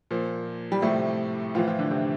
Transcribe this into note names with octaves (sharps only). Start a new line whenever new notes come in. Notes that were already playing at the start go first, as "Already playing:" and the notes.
A#2 F3
G3
A2 C3 F3 A3
A2 E3 F3 F4
F3 F4
D3 D4
C3 C4